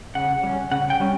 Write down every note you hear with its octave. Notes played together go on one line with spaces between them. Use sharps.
C#3 F#5
G3 C#4
C#3 F#5
G5
G3 C#4